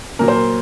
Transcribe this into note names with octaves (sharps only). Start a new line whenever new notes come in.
A#2 F#3 A#4
C5
A#4